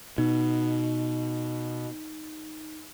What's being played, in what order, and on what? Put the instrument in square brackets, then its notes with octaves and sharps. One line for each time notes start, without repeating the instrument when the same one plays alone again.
[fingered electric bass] B2 [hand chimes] D#4